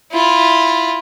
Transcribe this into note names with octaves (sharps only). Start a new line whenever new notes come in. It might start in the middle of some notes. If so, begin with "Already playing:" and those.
E4 F4